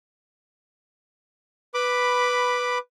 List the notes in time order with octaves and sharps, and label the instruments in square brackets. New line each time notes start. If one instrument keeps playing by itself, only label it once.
[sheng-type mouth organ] B4 B5 D6